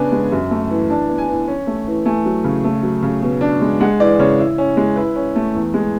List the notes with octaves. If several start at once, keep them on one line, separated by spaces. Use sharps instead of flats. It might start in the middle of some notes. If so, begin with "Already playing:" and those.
Already playing: C#3 B3 D4 G#5
G#3
F#2
A3
E3
D4 A5
B3
G#5
E3
C#4
A3
E3
A3 G#5
F#3
C#3
A3
F#3
C#3
B2
D4
G#3
G#3 F#5
E3 D5
C#3 C#5
E4
C#4
G#3
E4 B4
C#4
A3
E2
G#3